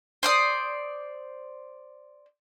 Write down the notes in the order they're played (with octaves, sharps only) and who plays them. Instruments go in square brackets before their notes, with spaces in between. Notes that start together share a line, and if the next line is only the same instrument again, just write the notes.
[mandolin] C5 D5 D#6